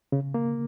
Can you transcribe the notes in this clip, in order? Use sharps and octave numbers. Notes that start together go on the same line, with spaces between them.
C#3
A#3